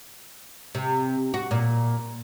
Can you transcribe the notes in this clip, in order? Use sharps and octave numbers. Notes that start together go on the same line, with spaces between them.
C3
F#4
A#2